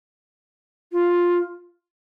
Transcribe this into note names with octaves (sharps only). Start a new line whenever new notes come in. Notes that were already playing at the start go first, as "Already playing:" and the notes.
F4